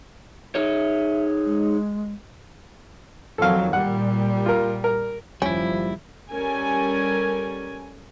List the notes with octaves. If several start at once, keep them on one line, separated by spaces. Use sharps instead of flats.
D#4 G#4 C#5 E5
G#3
F2 D#3 F#3 A4 F5
A#2 G3 F#5
F4 A#4
A#4
F#1 D#2 F3 G3 C#4 E4
G3 C#4 A4 A#4 G#5